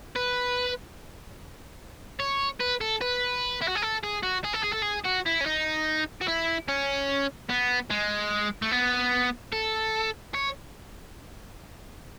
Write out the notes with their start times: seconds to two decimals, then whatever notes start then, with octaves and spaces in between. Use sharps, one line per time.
0.16 B4
2.20 C#5
2.60 B4
2.81 A4
3.01 B4
3.62 E4
3.68 F#4
3.76 G#4
3.83 A4
4.04 G#4
4.23 F#4
4.44 G#4
4.53 A4
4.63 G#4
4.72 A4
4.82 G#4
5.04 F#4
5.26 E4
5.41 C#4
5.46 D#4
6.21 F#4
6.28 E4
6.68 C#4
7.50 B3
7.90 G#3
8.62 A3
8.71 B3
9.53 A4
10.35 C#5